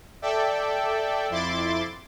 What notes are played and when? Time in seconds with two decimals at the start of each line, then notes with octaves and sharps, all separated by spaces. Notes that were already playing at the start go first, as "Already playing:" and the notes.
0.22 A4 D5 E5 G5
1.30 F2 E4 C6 D6 A6